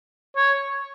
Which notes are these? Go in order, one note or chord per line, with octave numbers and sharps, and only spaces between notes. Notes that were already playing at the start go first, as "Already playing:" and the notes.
C#5